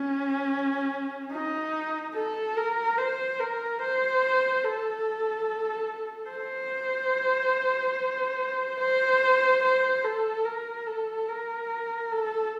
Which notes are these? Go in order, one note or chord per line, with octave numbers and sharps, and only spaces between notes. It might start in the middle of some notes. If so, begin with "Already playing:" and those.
Already playing: C#4
D#4
A4
A#4
C5
A#4
C5
A4
C5
C5
C5
A4
A#4
A4
A#4
A4